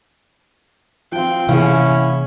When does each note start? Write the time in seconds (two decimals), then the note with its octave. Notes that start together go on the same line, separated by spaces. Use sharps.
1.12 F3 C4 F4 G5
1.49 C3 E3 A#3 C#4 E4 G#4 F5 F#5